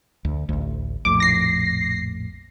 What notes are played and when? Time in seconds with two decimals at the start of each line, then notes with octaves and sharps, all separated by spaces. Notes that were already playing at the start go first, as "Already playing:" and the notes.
0.25 D2
0.49 A1 D2
1.05 A#1 F2 A2 D6
1.20 A#6 C7